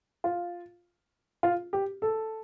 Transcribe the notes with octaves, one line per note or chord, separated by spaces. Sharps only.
F4
F4
G4
A4